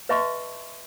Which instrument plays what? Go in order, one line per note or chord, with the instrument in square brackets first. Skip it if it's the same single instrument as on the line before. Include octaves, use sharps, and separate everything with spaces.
[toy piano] B4 D#5 E5 A5 C6 C#6